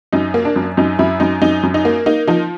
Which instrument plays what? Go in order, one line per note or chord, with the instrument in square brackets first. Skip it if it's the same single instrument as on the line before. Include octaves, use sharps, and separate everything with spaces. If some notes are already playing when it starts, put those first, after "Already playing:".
[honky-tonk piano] F#2 D#4
A#3
D4
F#2
F#2 D#4
F#2 E4
F#2 D#4
F#2 D#4
F#2
D#4
A#3
A#3 D#4
F3 D#4